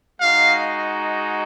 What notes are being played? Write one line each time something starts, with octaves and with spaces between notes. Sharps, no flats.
G#3 D#4 F#4 F5